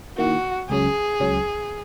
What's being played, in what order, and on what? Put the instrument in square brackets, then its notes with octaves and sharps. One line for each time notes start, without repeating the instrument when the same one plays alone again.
[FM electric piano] D#3 A#3 E4 [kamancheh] F#4
[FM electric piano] C#2 C#3 F#3 C#4 [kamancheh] G#4
[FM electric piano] C#2 C#3 F#3 C#4